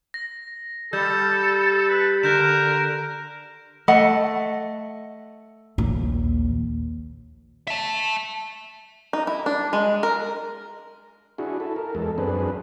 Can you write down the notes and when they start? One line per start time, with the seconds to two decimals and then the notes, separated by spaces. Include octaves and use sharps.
0.14 A#6
0.93 G3 A4 G6
1.89 B4
2.23 D3 A#4 F#6 G6 E7
3.88 A3 D#5 F#5
5.78 A#1 D#2
7.68 E5 A5
9.13 D#4
9.27 E4
9.46 D4
9.73 G#3
10.03 A#4
11.38 D4 E4 F#4 G#4
11.60 E4 A4
11.76 A#4
11.95 E2 G#3 A4
12.18 F#2 C4 D4 G#4 B4